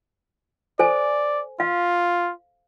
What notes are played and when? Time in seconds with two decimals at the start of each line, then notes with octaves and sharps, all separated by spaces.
0.79 A4 C5 D5 G#5
1.60 F4 F5